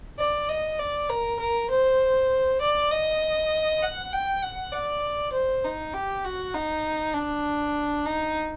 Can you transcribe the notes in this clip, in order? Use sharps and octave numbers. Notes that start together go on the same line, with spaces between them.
D5
D#5
D5
A#4
A#4
C5
D5
D#5
F#5
G5
F#5
D5
C5
D#4
G4
F#4
D#4
D4
D#4